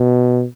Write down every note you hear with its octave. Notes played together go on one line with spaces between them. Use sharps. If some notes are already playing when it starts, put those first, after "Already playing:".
Already playing: B2